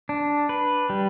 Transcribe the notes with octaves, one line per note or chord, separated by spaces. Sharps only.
D4
B4
G3